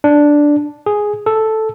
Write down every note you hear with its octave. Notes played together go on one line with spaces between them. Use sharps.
D4
G#4
A4